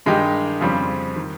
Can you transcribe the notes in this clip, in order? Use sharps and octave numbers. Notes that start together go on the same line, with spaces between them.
G2 D#3 G#3 D#4 G4
F2 C#3 G3 C4
D#3